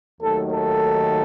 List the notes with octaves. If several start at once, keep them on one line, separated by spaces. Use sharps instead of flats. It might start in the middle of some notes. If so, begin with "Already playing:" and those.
D#2 D#3 F#3 A3 A4
A4